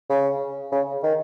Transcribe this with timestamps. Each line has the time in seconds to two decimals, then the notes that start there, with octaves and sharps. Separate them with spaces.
0.10 C#3
0.72 C#3
1.03 D#3